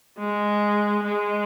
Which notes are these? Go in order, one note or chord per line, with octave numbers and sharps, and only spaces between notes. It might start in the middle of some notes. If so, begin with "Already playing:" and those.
G#3
G#3